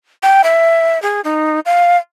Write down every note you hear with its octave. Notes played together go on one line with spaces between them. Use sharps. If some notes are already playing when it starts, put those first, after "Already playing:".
G5
E5
G#4
D#4
F5